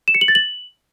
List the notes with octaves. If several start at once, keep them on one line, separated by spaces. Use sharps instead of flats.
E7
C#7
F#7
A6
F#7